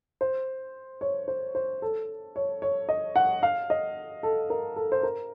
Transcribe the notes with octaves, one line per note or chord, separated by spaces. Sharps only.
C5
C#5
C5
C5
A4
C#5
C#5
D#5
F#5
F5
D#5
A4
A#4
A4
C5
A#4